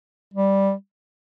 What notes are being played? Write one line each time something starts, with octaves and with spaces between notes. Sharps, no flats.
G3